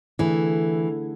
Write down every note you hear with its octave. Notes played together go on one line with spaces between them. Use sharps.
D3 E3 A3 E4 G#4